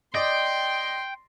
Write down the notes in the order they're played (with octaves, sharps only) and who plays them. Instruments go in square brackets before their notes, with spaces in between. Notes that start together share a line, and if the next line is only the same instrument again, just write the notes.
[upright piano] D5 D#5 [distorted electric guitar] G5 [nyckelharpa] C6